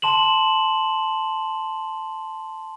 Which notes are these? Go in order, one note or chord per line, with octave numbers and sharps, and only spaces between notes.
A5 C6 E7 F#7